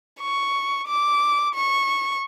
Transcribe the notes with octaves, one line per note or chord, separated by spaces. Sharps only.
C#6
D6
C#6